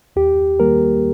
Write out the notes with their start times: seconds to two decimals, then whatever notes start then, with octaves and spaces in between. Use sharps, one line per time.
0.16 D#2 G4
0.60 D#3 G3 A#3 A#4